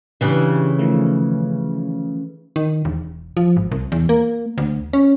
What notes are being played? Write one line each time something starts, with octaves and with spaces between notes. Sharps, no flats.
C#3 E3 D4 G4
D#3 F3 A3
D#3
E1
F3
G#1
C2
E2
A#3
D2
C#4